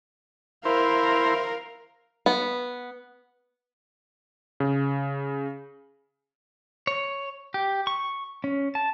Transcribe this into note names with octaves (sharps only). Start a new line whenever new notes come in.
E4 A#4 C5 F5
B3
C#3
C#5
G4
C#6
C#4
A5